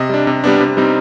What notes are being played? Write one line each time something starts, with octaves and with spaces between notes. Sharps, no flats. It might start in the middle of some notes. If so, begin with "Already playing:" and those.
Already playing: C3 D#5
G3 D4
C3
G3 B3 D4
C3
G3 C4 D#4